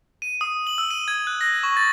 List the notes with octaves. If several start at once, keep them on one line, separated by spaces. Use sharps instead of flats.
D#7
D#6
F#7
E6
D#7
G#6
F#6
A#6
C#6
A6